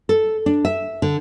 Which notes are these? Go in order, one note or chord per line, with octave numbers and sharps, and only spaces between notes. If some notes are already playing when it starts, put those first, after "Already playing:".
A4
D4
E5
D3